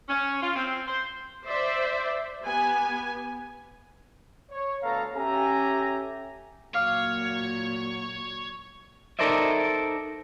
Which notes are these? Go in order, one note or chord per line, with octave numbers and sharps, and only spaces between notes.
C#4
F4
C4
C5
C5 D5 E5
B3 G4 G#5
C#5
D2 B3 A4 F5 A#5
C#4 G4 A4 E5 G#5 A#5
A#2 F#3 C#5 F5 D6 F6
D#4 A4 A#4 C5 D5 E5